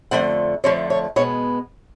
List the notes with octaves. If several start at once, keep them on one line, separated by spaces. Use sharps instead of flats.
F2 D3 F3 A3 F#5
F2 D3 F3 A3 C#5
C#5
B2 G#3 B3 C#5